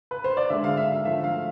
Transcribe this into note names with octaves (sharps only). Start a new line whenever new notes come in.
B4
C5
D5
D3 G#3 E5
F5
E5
F5
D3 F3 A3 E5
F5